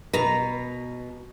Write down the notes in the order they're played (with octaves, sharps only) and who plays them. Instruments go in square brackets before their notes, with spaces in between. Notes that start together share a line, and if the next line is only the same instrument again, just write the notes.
[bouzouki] B2 A#5 [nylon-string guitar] B4